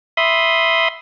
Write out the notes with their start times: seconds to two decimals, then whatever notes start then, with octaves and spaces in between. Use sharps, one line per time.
0.17 E5 B5 C6 D#6